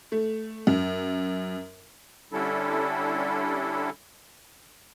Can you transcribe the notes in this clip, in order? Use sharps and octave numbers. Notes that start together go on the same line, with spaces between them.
A3
F#2
D3 G3 C#4 D4 E4 A4